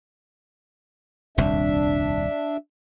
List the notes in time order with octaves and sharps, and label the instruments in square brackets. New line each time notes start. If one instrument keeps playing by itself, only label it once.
[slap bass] D#1 C2 F2 [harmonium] D4 E5